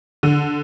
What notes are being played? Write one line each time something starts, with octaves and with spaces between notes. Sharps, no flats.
D3